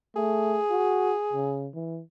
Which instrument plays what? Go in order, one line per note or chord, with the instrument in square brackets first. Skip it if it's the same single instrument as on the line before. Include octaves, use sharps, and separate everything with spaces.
[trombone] A3 [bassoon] G#4
[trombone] F#4
C#3
E3